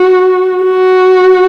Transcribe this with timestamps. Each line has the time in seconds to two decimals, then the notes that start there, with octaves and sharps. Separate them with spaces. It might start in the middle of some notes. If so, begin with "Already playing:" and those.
Already playing: F#4
0.64 F#4